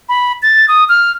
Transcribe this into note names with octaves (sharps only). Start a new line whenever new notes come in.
B5
A6
D#6
F6